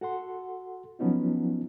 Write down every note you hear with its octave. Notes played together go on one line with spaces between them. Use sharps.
F#4 A4 F#5 C6
F3 F#3 B3 C#4 D#4 F4